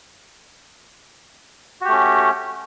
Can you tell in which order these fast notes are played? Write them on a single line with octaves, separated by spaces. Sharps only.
F#4 G4 A3 C#4